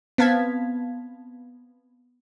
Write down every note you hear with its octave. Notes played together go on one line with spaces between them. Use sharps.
B3 C4 F5 A5 G#6 B6